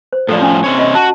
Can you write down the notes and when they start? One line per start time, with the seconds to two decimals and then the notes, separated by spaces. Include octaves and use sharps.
0.13 C5
0.29 A2 F3 A4 D5
0.41 C#4 G#5
0.64 C3 C4 C#5
0.79 F4 D#5
0.95 F#4 A5